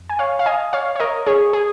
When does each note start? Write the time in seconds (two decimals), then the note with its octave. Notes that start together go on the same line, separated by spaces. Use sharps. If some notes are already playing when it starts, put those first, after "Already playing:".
Already playing: F2
0.10 G#5
0.19 C#5 F5
0.39 F5
0.46 D#5 G#5
0.73 C#5 F5
0.96 C#5
1.00 A#4 D#5
1.26 G#4 C#5
1.53 G#4